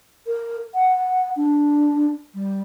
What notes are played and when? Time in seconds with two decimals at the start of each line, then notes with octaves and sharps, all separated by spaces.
0.27 A#4
0.74 F#5
1.36 D4
2.34 G3